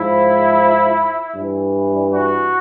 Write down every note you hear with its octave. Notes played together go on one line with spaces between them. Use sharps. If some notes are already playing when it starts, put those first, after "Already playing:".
Already playing: G#2 F3 E4
G2 E3
F#4